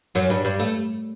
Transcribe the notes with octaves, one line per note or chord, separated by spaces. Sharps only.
F#2 F#3
G2 G3
G2 G3
A3